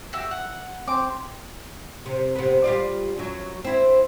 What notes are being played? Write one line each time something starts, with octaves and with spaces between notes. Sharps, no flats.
F#4 G4 E5
F#5
C4 D6
C3
C3 B3
G3 F4 D5
F#2 F#3
C4 E4